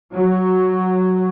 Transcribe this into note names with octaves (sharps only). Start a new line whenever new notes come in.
F#3